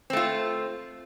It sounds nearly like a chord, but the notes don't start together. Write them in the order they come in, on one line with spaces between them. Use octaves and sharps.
C4 A3 F4